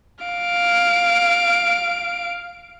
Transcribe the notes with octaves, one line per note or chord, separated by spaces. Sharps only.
F5 D7